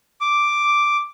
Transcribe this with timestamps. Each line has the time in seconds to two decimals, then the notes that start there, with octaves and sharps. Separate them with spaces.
0.21 D6